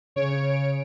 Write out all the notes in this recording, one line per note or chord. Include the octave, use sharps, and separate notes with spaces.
C#3 C#5 D7